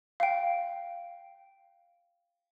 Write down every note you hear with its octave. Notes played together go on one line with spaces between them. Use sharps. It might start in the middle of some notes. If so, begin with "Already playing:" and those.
F5 G5